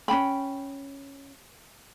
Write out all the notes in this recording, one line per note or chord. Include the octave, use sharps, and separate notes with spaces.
C#4 D4 G5 B5